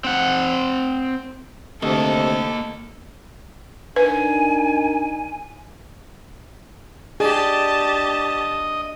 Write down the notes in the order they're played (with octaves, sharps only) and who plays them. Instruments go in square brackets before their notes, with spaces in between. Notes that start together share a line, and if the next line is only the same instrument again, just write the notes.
[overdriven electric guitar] C4 F#5
[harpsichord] D2 [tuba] C3 [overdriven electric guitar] A#3 D#5 [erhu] A4
[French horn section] D4 D#4 A#4 [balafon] B4 [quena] G#5
[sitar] D4 [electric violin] G4 A5 [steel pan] G#4 [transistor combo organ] D#5